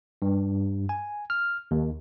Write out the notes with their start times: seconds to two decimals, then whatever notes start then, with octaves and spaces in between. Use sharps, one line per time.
0.22 G2
0.89 G#5
1.30 F6
1.71 D#2